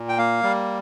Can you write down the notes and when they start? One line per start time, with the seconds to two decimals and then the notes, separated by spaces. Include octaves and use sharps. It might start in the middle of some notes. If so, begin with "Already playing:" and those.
Already playing: A#2
0.09 G5
0.18 A#3 F5
0.43 G3